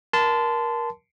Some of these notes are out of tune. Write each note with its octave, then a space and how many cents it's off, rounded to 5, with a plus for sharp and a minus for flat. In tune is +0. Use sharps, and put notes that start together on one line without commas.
A#4 +20 A5 -5 C6 -30